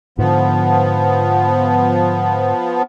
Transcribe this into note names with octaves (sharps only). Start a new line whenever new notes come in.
G#2 D3 F3 B3